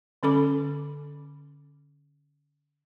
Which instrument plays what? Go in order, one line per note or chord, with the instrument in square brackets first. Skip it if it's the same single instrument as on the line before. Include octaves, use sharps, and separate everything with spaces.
[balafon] D3 C#4 A4 B5 D6